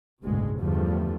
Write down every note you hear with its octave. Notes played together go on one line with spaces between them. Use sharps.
F#1 D2 G#2 B2 G#3
E2 G2 D3 F3 G3 A3